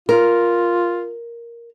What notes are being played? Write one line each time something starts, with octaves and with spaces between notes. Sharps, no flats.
F4 A#4